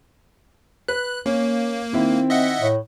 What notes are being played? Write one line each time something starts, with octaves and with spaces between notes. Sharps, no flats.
B4 F#6
A#3 C#4
D#3 C4 E4
D#5 E5 F#5
A2